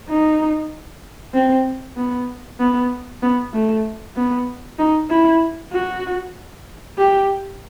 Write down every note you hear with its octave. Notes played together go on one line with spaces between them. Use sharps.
D#4
C4
B3
B3
B3
A3
B3
D#4
E4
F#4
G4